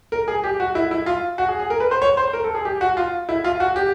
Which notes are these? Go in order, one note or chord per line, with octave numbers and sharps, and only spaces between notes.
A#4
G#4
G4
F#4
E4
E4
F4
F#4
G#4
G#4
A#4
B4
C5
C#5
C5
A#4
A4
G#4
G4
F#4
F4
E4
F4
F#4
G4